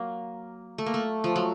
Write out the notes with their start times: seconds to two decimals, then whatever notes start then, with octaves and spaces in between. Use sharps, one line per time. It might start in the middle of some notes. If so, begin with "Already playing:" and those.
Already playing: F#3 A#3
0.78 A3
0.86 A#3
0.94 A3
1.24 F3
1.36 F#3